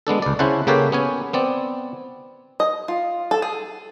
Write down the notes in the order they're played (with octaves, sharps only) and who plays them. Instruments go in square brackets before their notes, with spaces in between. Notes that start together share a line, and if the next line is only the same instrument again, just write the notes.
[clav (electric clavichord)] G#3 B3 D4 A4
C#2 D5
C#3 C#4 E4 C5 F#5 A5
C#3 A#3 G4 A4 B4 C#5
B3 C#4 G#5
B3 C4 D5
[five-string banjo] D#5
F4
A4
G#4